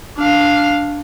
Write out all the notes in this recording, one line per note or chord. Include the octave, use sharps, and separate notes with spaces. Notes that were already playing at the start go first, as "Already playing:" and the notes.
D4 F5